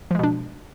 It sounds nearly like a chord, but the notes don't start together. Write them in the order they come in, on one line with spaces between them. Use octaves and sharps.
F3 G#3 B2 D4